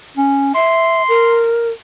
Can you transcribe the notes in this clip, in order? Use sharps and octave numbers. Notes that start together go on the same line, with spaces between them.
C#4
E5 C6
A#4